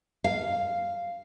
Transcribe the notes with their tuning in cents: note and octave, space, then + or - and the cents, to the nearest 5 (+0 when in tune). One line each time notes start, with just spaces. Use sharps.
F5 -5